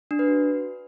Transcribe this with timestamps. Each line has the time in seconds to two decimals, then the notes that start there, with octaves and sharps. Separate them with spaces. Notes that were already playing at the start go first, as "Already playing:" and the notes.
0.11 D4
0.19 B4
0.28 F#4